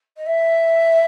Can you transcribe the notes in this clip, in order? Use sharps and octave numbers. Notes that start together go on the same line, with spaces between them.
D#5
E5